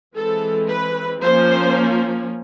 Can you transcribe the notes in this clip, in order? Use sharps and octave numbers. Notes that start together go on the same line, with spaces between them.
E3 G#3 C4 A4
B4
F3 A#3 C#4 C5